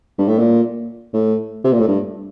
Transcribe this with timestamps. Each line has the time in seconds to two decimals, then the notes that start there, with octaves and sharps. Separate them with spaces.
0.18 G2
0.28 A2
0.38 A#2
1.14 A2
1.64 C3
1.72 A#2
1.80 A2
1.88 G2